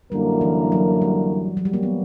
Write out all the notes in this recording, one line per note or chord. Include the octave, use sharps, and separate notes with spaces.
F#2 D3 G3 A#3 E4 A#4
E3
F#3
G3
F#3
G3
A#3
B3